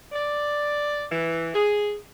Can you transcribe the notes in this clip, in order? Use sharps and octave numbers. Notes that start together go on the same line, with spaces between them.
D5
E3
G#4